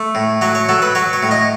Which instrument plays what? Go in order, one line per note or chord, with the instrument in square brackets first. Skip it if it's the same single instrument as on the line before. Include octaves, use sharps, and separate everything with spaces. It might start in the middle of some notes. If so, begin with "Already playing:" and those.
Already playing: [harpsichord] A3
A2
F#3 C#5
C#5
F#3 A4
B4
F#3 C#5
C#5
A2
D#5